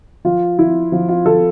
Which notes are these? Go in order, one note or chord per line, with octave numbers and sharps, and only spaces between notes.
F3 F4
F3 E4
F3 F4
F4
F3 A4